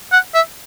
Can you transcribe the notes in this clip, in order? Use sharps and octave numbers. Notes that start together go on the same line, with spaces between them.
F#5
E5